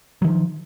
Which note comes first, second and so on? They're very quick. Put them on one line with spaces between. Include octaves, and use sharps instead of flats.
F#3 D#3 F3